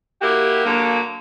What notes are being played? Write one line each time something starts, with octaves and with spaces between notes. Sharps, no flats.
A#3 E4 F#4 G4
D3 F#3 A#3